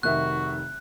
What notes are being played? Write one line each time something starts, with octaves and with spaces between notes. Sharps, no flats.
F1 D#3 F#4 E5 F#6